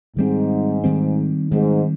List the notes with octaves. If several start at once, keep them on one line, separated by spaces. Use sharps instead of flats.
G#2 D#3 G3 C4
D#3 G3 C4
G#2 D#3 G3 C4